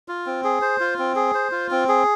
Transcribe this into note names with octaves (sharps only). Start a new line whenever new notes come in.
F4
C4
G#4
C5
F4
C4
G#4
C5
F4
C4
G#4